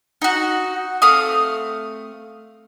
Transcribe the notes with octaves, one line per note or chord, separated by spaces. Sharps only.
D#4 F#4
A3 C4 F5 D#6